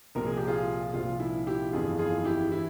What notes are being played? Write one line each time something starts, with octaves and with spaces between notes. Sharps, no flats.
C2 A#2 F3 A#4
G#4
G4
F4 G#4
C2 A#2 F3 F4
E4
E4 G4
G1 F2 E3 F4 G#4
F4 G#4
G#4
E4 G4
E3 E4